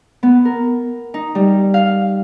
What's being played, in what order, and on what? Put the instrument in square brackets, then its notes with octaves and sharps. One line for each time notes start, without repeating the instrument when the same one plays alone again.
[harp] B3
A#4
D#4
G3
F5